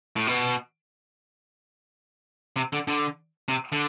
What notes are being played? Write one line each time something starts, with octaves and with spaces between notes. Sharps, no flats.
A2
B2
C3
D3
D3
C3
D3